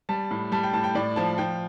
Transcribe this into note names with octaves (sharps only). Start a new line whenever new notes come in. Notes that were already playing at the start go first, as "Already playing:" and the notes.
G3 A5
A2
G3 A5
G5
A2 A5
G5
A2 D5
F3 A5
F3 G5